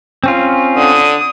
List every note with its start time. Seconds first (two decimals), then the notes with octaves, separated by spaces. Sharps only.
0.24 C4 C#4 F4
0.77 D3 D#6